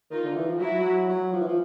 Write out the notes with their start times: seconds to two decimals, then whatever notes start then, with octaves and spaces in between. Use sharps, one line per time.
0.10 D#3 D#4 F4
0.24 D3
0.35 E3
0.48 F3
0.60 F#3 E4 F#4
0.79 F#3
1.09 F#3
1.33 F3
1.41 E3
1.48 F3